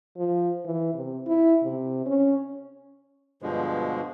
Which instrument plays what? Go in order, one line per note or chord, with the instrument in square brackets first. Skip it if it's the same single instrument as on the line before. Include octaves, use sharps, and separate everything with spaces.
[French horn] F3
E3
C3
E4
C3
C#4
[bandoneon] G2 B2 D3 F3 G#3